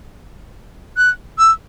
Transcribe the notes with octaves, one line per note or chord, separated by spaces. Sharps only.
F#6
E6